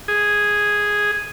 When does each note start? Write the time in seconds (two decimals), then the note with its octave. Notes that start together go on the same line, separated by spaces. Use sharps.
0.08 G#4